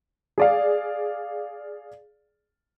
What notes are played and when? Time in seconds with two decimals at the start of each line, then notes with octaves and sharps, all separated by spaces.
0.38 G#4 D5 F5